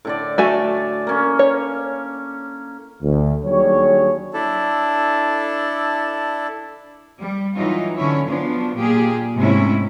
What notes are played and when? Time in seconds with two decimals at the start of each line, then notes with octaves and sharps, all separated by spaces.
0.05 A2 D3 D5
0.38 A3 F#4 G#5 A5
1.07 A#3 C#4
1.39 C#5
3.02 D2
3.45 D#2 F#3 G3 D4 G#4 C#5
4.34 D4 E4 A4
7.20 G3
7.56 E3 F#3 D#4 F4
7.96 D3 C#4 E4 C#5
8.27 F3 F#3 B3 D4
8.75 A#2 A#3 G4 G#4
9.36 G#2 C3 G#3 A3 C#4 E4